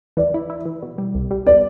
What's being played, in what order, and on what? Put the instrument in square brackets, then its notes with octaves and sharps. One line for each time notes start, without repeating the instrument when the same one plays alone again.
[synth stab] E3 [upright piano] D5
[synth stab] E4
E4
E3
B2
G3
C2
G3
[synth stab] B3 [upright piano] D5